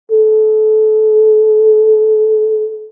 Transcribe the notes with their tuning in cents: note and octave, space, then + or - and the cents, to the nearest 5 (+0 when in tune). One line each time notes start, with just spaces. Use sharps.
A4 -25